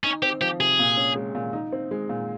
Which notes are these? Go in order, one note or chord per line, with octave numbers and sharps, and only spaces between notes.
C#4 D#4
C4 G4
F3 G4
C3 G#4
A#2
C#4
G#3
A#2
D#4
C4
G#3
A#2